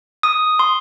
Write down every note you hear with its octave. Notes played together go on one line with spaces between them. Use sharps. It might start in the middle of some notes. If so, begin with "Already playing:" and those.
D#6
C6